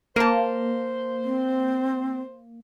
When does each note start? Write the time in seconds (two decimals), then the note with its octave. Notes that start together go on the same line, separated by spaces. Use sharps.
0.16 A#3 A#4 C5 A5
1.24 C4